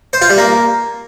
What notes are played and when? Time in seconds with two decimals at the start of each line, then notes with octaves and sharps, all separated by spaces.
0.13 C5
0.21 F4
0.30 G3
0.38 A#3